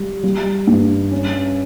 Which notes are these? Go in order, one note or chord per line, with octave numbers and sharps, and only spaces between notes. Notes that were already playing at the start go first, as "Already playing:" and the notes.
Already playing: G3
G3
G2
C#4